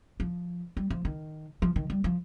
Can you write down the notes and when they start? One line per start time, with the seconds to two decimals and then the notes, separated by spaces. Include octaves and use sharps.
0.20 F3
0.77 G3
0.90 F3
1.05 D#3
1.62 F3
1.76 D#3
1.90 G3
2.04 F3